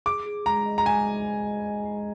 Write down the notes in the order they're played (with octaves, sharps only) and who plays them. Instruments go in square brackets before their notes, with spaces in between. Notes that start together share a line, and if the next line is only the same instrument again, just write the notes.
[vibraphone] G#4 [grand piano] D6
[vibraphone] G#4
[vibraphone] G#3 [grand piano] A#5
[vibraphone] D#5
[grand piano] A#5
[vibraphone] G#3 [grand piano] G#5
[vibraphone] G#3
G#3
D#5
D#5
G#3